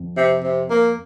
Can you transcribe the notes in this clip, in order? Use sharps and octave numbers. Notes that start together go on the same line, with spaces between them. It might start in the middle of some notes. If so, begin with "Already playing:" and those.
Already playing: F2
C3
C3
A#3